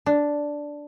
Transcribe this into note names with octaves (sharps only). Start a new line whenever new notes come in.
D4